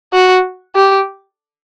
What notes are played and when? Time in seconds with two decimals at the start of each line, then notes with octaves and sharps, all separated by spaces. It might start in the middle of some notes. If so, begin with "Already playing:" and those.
0.13 F#4
0.75 G4